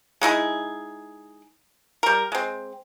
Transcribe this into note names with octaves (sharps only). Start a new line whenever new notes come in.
G#3 D#4 E4 G#4
G3 A#4
G#3 C4